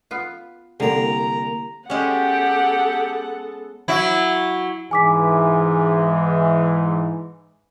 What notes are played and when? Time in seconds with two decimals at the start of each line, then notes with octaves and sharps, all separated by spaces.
0.11 B3 F4
0.80 C2 D3 A#3 A#5
1.90 G#3 B3 C#4 G4 A4 F#5
3.88 F#3 E4
4.91 G#2 E3 G#5 D6 B6